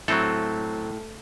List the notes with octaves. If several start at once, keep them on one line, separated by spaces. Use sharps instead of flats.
A2 F#3 C4 A4